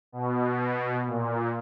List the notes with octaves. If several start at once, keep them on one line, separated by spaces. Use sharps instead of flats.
B2
A#2